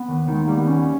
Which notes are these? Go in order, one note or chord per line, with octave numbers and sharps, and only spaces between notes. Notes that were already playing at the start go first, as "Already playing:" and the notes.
Already playing: B3
D#2
D#3 G#3
G3 A#3
B3
D#2 C#4